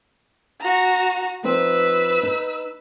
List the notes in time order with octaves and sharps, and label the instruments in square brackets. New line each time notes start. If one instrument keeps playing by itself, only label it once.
[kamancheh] F#4 A#5
[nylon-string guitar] F3 C4 D#4 [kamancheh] B4 E6
[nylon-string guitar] D#4